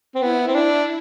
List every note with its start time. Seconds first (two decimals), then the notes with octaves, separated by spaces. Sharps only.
0.15 C4
0.22 B3 E4
0.48 C4
0.55 D4